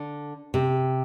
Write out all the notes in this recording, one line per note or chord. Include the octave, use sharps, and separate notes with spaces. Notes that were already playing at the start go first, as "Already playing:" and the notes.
Already playing: D3
C3